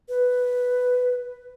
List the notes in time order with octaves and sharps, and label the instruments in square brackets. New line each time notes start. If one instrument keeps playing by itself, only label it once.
[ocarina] B4